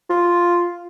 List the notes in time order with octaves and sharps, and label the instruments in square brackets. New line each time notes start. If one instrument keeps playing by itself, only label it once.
[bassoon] F4